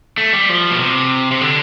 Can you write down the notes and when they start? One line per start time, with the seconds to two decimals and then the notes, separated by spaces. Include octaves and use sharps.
0.18 A3
0.33 G3
0.49 F3
0.71 B2
0.79 C3
1.31 C3
1.41 D3